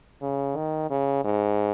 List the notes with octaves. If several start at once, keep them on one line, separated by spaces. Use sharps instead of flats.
C#3
D#3
C#3
G#2